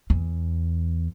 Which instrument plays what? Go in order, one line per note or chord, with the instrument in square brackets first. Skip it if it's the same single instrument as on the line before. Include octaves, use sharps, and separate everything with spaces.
[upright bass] E2